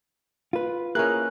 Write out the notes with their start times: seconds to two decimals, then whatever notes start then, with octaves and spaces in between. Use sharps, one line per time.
0.53 F4 B4
0.95 A#3 C#4 E4 G#4 A#4 F#6